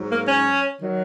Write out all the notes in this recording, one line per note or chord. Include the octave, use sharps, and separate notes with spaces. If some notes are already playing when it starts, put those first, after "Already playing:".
Already playing: G#2 F#3
A#3
C#4
D#3 F#3